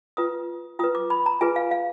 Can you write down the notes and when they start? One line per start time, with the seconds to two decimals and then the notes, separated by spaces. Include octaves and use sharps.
0.17 F4 B4 D#6
0.79 F4 B4 D#6
0.95 D6
1.10 B5
1.26 A#5
1.41 F4 G#4 B4 G#5
1.56 F5
1.71 F5